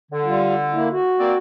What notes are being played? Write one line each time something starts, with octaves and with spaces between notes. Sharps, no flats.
D3
G3 F4
A#3 E4
F#4
A#3 C4 D5